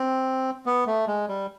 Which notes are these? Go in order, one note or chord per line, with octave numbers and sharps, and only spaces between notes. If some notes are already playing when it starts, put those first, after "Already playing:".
Already playing: C4
B3
A3
G#3
G3